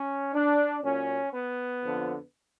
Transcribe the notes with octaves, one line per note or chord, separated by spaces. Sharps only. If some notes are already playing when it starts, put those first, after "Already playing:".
Already playing: C#4
D4
A#2 F#3 C#4
B3
F2 D3 F3